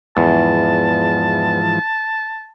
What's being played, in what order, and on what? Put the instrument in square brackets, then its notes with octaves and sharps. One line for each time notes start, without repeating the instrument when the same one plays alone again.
[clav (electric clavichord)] E2 [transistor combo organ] G#2 E3 F3 [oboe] A5